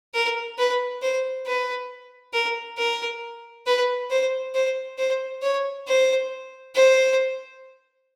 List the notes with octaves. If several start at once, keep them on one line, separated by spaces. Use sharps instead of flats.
A#4
B4
C5
B4
A#4
A#4
B4
C5
C5
C5
C#5
C5
C5